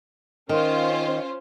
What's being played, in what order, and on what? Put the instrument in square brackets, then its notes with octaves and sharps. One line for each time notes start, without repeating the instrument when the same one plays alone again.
[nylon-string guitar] D#3 [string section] C#4 F4 C5